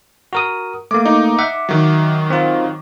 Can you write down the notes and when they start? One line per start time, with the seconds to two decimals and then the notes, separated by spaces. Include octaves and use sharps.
0.33 F#4 A#4 D#6
0.91 A3 A#3 D6
1.06 D#4
1.39 E5 F#5
1.69 D#3 F#3
2.30 C4 F4